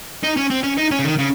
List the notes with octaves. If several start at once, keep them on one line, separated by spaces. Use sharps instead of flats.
D#4
C#4
C4
C#4
D#4
C#4
C#3
D#3
C#3